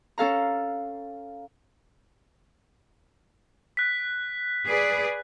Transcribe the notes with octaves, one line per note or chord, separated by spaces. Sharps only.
C#4 A4 F5 A#5
F#6 B6
G#4 B4 D5